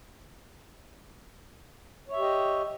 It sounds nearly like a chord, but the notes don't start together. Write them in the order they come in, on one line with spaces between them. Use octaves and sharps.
C#5 E5 G4 D#5